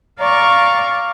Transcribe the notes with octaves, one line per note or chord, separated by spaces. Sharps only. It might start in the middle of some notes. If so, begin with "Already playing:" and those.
D5 F5 A#5 C#6